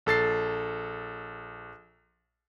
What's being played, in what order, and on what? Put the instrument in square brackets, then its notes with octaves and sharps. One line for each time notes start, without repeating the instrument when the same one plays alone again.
[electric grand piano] A#1 A4 A6 C7